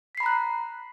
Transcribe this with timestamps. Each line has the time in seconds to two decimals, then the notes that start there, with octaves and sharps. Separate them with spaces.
0.15 B6
0.17 C7
0.20 B5
0.23 A#5
0.26 F#6